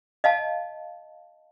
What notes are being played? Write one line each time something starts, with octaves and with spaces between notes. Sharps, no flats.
D#5 F5 A5